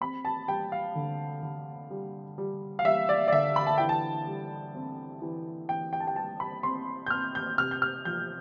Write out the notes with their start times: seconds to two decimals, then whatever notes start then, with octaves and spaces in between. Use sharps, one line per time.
0.01 C4 B5
0.25 A5
0.48 G3 G5
0.72 F5
0.95 D3
1.43 D3
1.91 G3
2.38 G3
2.79 F5
2.85 G3 E5
3.09 D5
3.28 D5
3.32 D3 E5
3.56 B5
3.67 A5
3.78 E3 G5
3.89 A5
4.27 G3
4.74 C4
5.22 E3
5.69 E3 G5
5.93 G5
6.00 A5
6.07 G5
6.16 G3 A5
6.40 B5
6.63 C4 C6
7.06 G6
7.10 C4 F6
7.35 G6
7.58 C3 F6
7.71 G6
7.82 F6
8.05 F3 G6